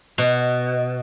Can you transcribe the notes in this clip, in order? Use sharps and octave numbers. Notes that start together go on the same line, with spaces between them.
B2